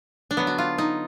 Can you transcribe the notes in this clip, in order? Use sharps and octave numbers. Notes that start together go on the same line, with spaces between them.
D4
D3 F#3 B3
F#4
F4
D#4